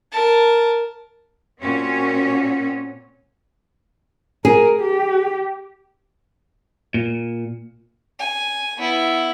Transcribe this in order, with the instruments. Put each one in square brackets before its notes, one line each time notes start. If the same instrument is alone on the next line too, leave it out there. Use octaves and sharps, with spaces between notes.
[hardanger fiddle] A#4 A5
[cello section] A#2 C4 C#4 F#4 C#5
[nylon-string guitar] G#4 [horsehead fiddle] A#4
[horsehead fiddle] G4
[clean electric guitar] A#2
[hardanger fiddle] G#5
B3 E4